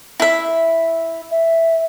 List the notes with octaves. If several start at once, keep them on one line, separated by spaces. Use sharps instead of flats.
E4 E5
E5